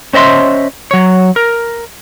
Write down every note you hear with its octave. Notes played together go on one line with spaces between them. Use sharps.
C#4 C5 D#5 E5 C6
F#3 C#5
A#4